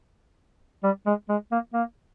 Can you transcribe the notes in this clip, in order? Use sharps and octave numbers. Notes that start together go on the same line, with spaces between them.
G3
G#3
G#3
A#3
A#3